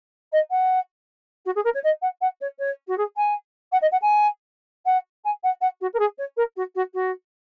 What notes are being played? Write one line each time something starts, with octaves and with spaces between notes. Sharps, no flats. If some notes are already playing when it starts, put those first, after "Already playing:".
D#5
F#5
F#4
G#4
A#4
C#5
D#5
F#5
F#5
C#5
C#5
F#4
G#4
G#5
F#5
D#5
F#5
G#5
F#5
G#5
F#5
F#5
F#4
A#4
G#4
C#5
A#4
F#4
F#4
F#4